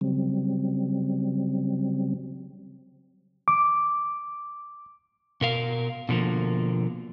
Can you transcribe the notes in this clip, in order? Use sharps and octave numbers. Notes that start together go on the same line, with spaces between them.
C#3 F#3 G3 C4
D6
B2 A#4 F5
B2 D3 F3 A#3